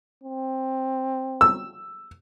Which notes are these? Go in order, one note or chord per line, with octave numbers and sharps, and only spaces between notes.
C4
E6